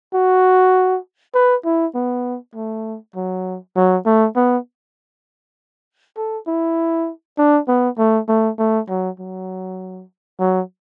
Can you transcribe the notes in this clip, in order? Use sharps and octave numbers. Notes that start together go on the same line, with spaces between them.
F#4
B4
E4
B3
A3
F#3
F#3
A3
B3
A4
E4
D4
B3
A3
A3
A3
F#3
F#3
F#3